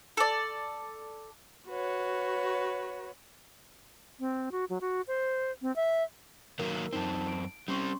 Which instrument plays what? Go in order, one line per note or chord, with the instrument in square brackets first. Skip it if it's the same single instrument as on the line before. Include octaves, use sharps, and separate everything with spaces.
[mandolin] A4 D5
[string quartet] F#4 B4 C#5
[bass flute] C4
F#4
F#3
F#4
C5
C4
E5
[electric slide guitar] D#3 F#3 A#3 [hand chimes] A#4
[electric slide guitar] F#2 C4 [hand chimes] D#4 A5
[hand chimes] D7
[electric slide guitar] G3 C4 [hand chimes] C#4 C6 C#6